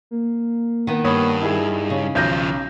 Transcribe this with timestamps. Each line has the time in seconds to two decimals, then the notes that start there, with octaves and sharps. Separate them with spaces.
0.11 A#3
0.87 D#3 B3
1.04 G2 C#5 B5 D#6
1.41 D#4 E4 G#4
1.90 C#3
2.15 B1 D#3 F3 G6 A#6